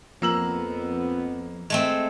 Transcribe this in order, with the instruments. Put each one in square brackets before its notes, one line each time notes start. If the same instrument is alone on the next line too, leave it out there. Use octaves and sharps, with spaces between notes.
[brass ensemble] F2 B3 [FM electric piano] F3 [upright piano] A#3 E6 F#7
[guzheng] G#3 A3 C4